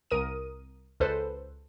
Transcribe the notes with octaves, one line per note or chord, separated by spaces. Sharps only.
C2 A#4 D#6 D#7
C#2 A4 B4 C5